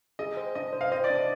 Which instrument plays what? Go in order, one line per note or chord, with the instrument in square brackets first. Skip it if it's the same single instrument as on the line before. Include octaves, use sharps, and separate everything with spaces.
[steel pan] G#4 [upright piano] D#5
[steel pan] C5
[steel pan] D4 [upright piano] D#5
[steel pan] C5
[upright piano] F5
[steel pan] C5 [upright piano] D#5
[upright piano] D5
[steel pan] D4
[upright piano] D#5